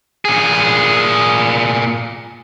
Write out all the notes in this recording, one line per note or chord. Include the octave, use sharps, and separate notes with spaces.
A#2 G#4